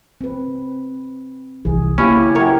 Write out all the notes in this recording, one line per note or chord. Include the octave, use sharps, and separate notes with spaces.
C4 B4
C2 E3 G#4
C#3 A#3 B3 C#4 E4 G4 F5
F#2 A#4 C#5 G5